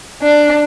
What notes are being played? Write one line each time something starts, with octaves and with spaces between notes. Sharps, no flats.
D4